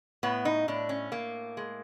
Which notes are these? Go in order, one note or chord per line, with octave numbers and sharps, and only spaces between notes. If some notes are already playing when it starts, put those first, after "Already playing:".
A2 B3
D#4
A2 D4
C#4
A2 A#3
G#3